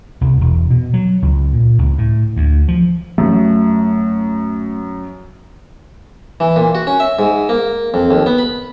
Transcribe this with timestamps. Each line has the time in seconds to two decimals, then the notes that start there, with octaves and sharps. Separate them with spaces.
0.21 C2
0.41 E1
0.71 B2
0.94 F#3
1.22 C#2
1.53 A#2
1.79 C#2
1.98 A2
2.36 D2
2.68 F3
3.18 F#2 A3
6.40 E3
6.56 A#2
6.75 F#4
6.87 C#4
7.00 E5
7.19 G#2
7.49 A#3
7.94 F2
8.11 D#2
8.26 B3
8.38 B5